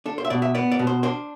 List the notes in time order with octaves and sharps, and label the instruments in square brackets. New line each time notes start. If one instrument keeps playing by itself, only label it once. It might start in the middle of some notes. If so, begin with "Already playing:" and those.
[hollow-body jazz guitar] D4 A4
C5
E5
B2 D5
E5
B3 D5
D5
B2
C5
D4 C5